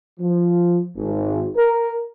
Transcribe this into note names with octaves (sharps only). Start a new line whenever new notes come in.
F3
G#1
A#4